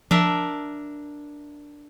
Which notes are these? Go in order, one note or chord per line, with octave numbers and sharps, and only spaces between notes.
F3 D4 A#4 E5